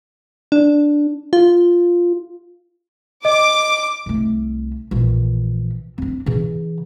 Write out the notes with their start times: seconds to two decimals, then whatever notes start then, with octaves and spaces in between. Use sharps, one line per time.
0.52 D4
1.33 F4
3.25 D#5 D6
4.06 C2 A3
4.91 A#1 E3
5.98 C4 D4
6.26 C#3 E3